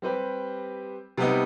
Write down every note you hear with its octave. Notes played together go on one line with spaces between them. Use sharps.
G3 C4 G4 B4
C3 G3 B3 D#4